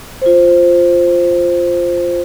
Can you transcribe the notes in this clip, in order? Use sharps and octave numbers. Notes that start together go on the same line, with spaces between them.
F4 C5